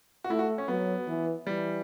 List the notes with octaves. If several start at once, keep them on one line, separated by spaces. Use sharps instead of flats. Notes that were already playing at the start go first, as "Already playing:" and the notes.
F#4
A3 E4
F#4
C#4
F#3 B3
E3
E3 G3